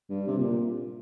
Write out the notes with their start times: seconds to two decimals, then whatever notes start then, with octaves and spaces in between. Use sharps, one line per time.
0.10 G2
0.28 C3
0.38 A#2